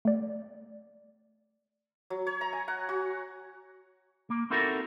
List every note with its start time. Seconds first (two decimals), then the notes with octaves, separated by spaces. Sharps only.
0.05 A3 D5
2.10 F#3
2.26 C#5
2.41 A#5
2.53 G#5
2.68 F#5
2.89 F#4
4.30 A#3
4.50 C4 D#4 E4 F#4 A4 A#4